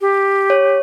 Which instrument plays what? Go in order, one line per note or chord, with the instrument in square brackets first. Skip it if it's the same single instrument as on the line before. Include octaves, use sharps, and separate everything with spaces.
[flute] G4
[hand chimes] C#5